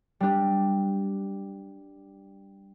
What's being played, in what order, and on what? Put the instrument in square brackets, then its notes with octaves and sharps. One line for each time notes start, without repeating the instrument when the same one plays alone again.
[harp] G3 D4 G4